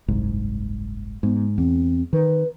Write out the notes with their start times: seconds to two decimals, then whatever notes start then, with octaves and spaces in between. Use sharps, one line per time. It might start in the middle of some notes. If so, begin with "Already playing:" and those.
0.08 F#1 C2 G#2
1.23 G#2 B3
1.58 E2 C4
2.13 D#3 B4